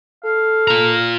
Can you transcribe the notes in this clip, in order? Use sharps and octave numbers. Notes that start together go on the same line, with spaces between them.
A4 F5
F4 A#5